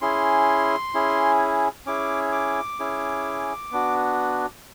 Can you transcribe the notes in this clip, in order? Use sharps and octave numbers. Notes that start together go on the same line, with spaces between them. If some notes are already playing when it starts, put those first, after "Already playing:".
C#4 E4 G#4 C6
C#4 E4 G#4
C#4 E4 G#4 D6
D6
C#4 E4 G#4
B3 D4 F#4